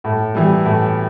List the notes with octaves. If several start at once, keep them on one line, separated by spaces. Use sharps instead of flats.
A2
E3 G3
A2